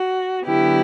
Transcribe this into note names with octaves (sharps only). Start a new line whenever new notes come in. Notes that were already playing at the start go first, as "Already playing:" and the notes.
Already playing: F#4
D3 F#3 B3 E4 G4